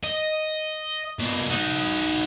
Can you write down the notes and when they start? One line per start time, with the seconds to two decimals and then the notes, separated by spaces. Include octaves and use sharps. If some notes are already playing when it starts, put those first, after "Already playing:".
0.03 D#5
1.19 B2 A#3
1.50 D#4 F#4